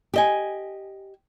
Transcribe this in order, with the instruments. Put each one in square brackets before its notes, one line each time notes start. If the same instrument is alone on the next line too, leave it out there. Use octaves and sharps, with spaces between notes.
[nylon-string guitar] G4 D#5 G#5